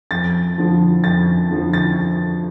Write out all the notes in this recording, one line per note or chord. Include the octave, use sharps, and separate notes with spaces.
F2 A6
D3 F3
F2 A6
D3 F3
A6